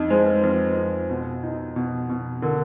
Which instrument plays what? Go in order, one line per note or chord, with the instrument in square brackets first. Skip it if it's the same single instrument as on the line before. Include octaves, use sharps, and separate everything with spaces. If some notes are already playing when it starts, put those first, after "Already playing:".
Already playing: [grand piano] F2 [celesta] D#4 D#5
[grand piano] G#3 [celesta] C5
[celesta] B4
[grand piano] F2 [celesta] B4
[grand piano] F2
B2
D#4
B2
B2
[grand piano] D3 [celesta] A#4